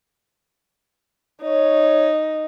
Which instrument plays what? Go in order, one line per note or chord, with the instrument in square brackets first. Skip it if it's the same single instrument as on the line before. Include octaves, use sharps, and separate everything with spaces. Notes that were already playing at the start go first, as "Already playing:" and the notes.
[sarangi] D#4 [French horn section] C#5